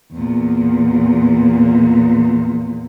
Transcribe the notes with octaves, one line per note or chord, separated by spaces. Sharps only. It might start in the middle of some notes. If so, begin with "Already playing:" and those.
E2 A#2